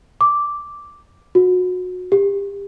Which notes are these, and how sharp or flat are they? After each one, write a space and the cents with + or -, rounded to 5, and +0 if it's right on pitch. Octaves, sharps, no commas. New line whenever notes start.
D6 -5
F#4 -25
G4 +30